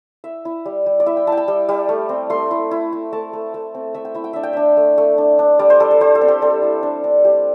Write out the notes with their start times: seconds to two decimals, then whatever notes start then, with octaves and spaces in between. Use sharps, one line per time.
0.24 E4 E5
0.45 E4
0.65 G3
0.86 G3
1.00 D5
1.06 E4 E5
1.17 G5
1.27 E4 A5
1.32 G5
1.37 A5
1.48 G3
1.69 G3
1.89 A3
2.09 C4
2.30 A3 C6
2.51 E4
2.71 E4
2.93 E4
3.12 A3 A5
3.33 A3
3.54 A3
3.75 C4
3.94 A3 E5
4.05 G5
4.14 E4 E5
4.24 G5
4.33 D4 E5
4.43 G5
4.53 D4 E5
4.77 A3
4.98 A3
5.18 D4
5.39 D4
5.59 G3 D5
5.70 C5
5.80 G3 A4
5.91 A4
6.01 G3 C5
6.15 A4
6.21 C4
6.28 G4
6.42 G3 A4
6.62 E4
6.83 D4
7.04 D4
7.24 G3 G4